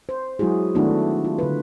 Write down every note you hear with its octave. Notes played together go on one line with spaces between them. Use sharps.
C5
F#3 G#3 E4 F#4 G#4
D#3 A3 B3 D4 E4 F#4
F4
D3 B4